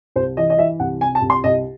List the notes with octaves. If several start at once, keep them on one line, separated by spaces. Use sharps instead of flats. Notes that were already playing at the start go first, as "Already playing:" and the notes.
C2 C5
E3 D#5
D#5
E3 E5
C2 F#5
C3 G#5
A5
C2
C6
C2 D#5